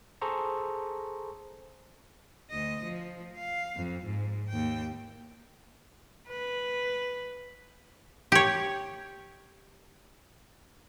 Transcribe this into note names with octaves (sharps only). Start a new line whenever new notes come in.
G#4 A4 C5 A#5 C#6
D2 D#5
F3
F5
F2
G#2
D#2 G5
B4
G4 C#5